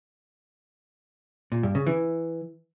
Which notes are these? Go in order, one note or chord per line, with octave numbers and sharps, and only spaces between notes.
A#2
G2
C#3
E3